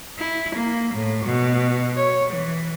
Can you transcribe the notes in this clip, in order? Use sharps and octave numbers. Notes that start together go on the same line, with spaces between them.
E4
A#3
A2
B2
C#5
E3